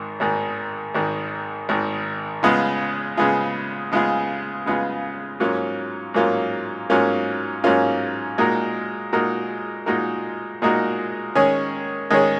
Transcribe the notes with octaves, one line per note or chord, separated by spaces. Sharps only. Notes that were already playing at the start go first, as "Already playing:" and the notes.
Already playing: G#1 G#2 D#3
G#1 G#2 D#3
G#1 G#2 D#3
G#1 G#2 D#3
C#3 G#3 B3 F4 G#4
C#3 G#3 B3 F4 G#4
C#3 G#3 B3 F4 G#4
C#3 G#3 B3 F4 G#4
G#2 F#3 A#3 C#4 F4
G#2 F#3 A#3 C#4 F4
G#2 F#3 A#3 C#4 F4
G#2 F#3 A#3 C#4 F4
A#2 G#3 D#4 F#4 A#4
A#2 G#3 D#4 F#4 A#4
A#2 G#3 D#4 F#4 A#4
A#2 G#3 D#4 F#4 A#4
D#3 G#3 C#4 G#4 C#5
D#3 G#3 C#4 G#4 C#5